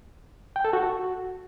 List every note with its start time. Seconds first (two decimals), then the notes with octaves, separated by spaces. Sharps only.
0.56 G5
0.65 A4
0.73 F#4